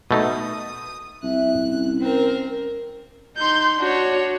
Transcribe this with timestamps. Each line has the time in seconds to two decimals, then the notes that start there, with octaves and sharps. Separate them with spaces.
0.11 B2 A3 D#4 D#6
1.23 C2 E5 F#6
1.66 C#4
1.99 C4 A#4
3.37 D#4 C6 G6
3.79 D4 F#4 C#5